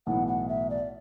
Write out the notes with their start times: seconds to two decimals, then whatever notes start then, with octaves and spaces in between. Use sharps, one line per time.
0.07 B1 A2 E3 B3 F#5
0.28 F#5
0.49 E5
0.70 D5